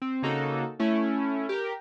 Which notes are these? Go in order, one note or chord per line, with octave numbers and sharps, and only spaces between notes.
C4
C#3 A#3 D#4 F#4 A4
A3 C#4 E4
G4 A#4